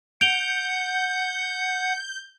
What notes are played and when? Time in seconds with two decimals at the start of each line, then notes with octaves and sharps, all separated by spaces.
0.21 F#5 G6 D7 F7 G7